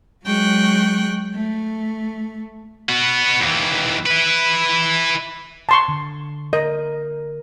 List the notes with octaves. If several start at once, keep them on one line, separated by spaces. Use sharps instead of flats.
F#3 G#3 G5 C#6 F#6
A3
B3 F#4
D#2 E3
E4 B4
A5 C6 C#6
D3
A#4 D#5